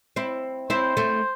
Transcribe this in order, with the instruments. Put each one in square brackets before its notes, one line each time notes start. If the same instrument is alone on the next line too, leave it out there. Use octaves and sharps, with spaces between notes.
[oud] C4 E4
[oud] C4 E4 [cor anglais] C5
[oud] A3 C4